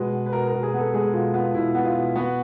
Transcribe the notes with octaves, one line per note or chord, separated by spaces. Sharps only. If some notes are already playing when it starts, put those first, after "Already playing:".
Already playing: B2 G#3 B4
B2
B4
B2 A#4
A#4
B2
G#4
B3 A4
G#3 G#4
B2 F4
B3 F4
B2 E4
B3
F4
B2
B3 F#4